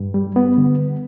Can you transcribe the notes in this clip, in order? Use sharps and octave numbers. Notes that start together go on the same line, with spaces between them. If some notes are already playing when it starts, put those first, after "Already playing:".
Already playing: G2
G3
B3
D3